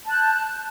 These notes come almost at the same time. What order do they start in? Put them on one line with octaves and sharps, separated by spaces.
A5 F#6 G6